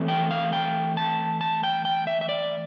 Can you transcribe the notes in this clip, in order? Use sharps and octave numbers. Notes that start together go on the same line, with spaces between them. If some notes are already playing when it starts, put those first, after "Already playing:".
Already playing: E3 A3 C4
G5
F5
G5
A5
A5
G5
G5
E5
E5
D5